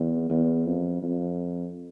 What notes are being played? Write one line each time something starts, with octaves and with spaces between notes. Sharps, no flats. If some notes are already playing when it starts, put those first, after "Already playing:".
Already playing: E2
E2
F2
F2